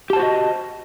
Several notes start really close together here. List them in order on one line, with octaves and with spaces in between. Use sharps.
G4 A5 C5 F#4 D#5